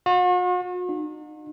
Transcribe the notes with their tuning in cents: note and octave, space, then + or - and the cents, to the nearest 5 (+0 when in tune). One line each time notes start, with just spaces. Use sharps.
F#4 -45
D#4 -35